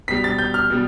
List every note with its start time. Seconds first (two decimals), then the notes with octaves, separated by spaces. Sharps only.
0.08 B2 G3 B6
0.24 A6
0.39 G6
0.54 F6
0.70 B2 G3